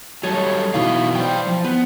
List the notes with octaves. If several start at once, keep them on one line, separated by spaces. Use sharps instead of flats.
F#3 G3 A4 C#5 D#5 A5
F#2 B2 E3 D#4 F5
C5 D5 F5 G5
F3
B3 B4